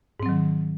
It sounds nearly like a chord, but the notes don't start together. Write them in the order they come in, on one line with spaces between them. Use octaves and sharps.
G#2 C4 F#3 D#3